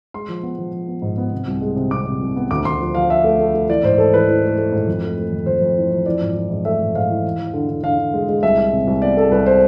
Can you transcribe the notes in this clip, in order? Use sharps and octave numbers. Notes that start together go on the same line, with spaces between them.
G#3 C6
F3
B3
F3
F3
B3
G#2
B3
C3
C2
G#3
C3
C3 D6
C3
C2
B3
D2 D6
D2 C6
F3
F3 F5
F3 E5
A3
A3
A3
E3 D5
G#2 C5
A3 A4
E3 B4
E3
A3
A3
G#2
F2
A3
A3
F2
F2 C5
F2
E3
F2
E3 D5
G#2
E3
G#2
A3 E5
G#2
G#2 F5
E3
E2
E2
D3
D3
D3 F5
D3
G#3
G#3
C2 E5
G#3
C3
C2
B3 D5
G#3 A4
C2 B4
C5